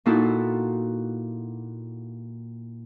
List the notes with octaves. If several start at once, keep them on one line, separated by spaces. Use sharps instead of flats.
A#2 A#3 D#4 E4 F#4 A4